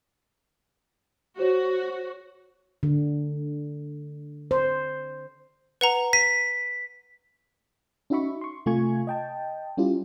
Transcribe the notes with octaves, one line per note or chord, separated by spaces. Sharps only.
F#4 C5 C#5
D3
C5
B4 F#5 A#5
B6 D#7
C#4 D#4 F#4 E5 B5 C#6
C6 C#6
C3 A3 F4 G#5 C#6 G#6
D#5 G5 A5
G3 C#4 E4 F4 G4